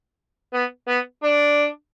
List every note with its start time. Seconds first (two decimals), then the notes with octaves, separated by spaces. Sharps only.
0.53 B3
0.88 B3
1.23 D4